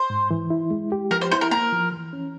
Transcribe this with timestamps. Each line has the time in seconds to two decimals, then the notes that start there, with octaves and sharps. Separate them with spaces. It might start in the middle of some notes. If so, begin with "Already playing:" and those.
Already playing: C5
0.10 G#2
0.31 E3
0.50 E4
0.71 G#3
0.92 G4
1.11 F3 A#4
1.21 C5
1.31 E4 C5
1.41 A#4
1.51 A#3 A#4
1.72 F3
1.92 E3
2.13 C#4